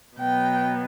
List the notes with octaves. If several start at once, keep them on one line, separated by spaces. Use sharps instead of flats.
B2 F#3 B3 G5